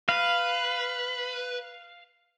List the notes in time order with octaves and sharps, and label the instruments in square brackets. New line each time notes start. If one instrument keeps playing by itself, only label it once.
[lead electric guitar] B4 [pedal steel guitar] F5